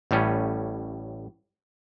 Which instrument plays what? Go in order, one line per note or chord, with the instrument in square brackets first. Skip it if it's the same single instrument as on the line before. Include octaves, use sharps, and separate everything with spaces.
[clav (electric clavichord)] A1 A2 G3 C#4